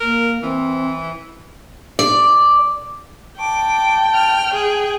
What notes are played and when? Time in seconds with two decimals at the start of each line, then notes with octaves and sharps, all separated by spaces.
0.01 A#3 A#4
0.43 E3 C4
1.99 D5
3.40 G5 A5 D6
4.15 F6
4.53 G#4